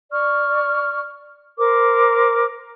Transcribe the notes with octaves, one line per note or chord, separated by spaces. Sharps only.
D5 C#6 F6
A#4 C5 D6